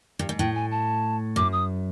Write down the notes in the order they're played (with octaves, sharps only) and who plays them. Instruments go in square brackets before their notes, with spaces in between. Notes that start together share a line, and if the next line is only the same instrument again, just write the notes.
[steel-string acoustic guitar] G2
G#2
[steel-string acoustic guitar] A2 [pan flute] G5
[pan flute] G#5
A5
[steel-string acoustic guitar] F#2 [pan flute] D6
[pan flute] D#6